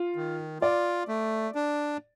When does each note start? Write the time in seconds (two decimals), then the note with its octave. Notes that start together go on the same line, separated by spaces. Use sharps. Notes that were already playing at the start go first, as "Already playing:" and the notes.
Already playing: F4
0.16 D#3
0.61 F4 D5
1.08 A3
1.55 D4